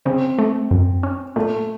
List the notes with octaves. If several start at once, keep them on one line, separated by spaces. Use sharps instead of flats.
C#3 C4
A3
F#2
C#4
A#2 A3